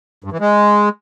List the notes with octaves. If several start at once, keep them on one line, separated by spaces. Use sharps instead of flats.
G2
E3
G#3